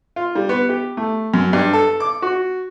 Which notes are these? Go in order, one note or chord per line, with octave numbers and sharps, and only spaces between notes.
F4
G3
B3
G4
A3
F#2
G2
A4
D6
F#4